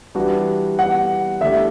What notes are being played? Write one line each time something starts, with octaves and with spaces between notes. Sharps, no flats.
E3 G3 D4 F#4 B4
F#5
D3 A3 E4 G4 E5